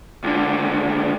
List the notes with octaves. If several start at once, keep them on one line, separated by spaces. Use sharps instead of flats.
C#2 D3